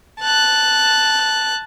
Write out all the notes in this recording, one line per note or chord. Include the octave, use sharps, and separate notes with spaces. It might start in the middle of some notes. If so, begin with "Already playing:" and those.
A5 F#6